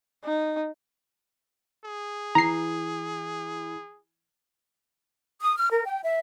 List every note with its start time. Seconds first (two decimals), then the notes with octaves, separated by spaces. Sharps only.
0.25 D#4
1.85 G#4
2.35 E3 A#5 C7
5.41 D#6
5.57 F6
5.70 A#4
5.85 G5
6.03 E5